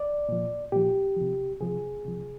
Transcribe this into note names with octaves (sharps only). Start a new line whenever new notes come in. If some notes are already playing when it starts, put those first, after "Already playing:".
Already playing: D5
A#2 F3
A#2 F3 G4
C3 F3
C3 F3 G#4
C3 F3